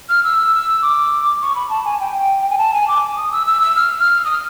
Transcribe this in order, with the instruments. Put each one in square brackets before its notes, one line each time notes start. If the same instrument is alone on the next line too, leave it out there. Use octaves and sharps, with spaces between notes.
[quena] F6
E6
D6
C#6
B5
A5
G#5
G5
G5
G#5
A5
G#5
D6
D#6
E6
E6
E6
F6
F6
D#6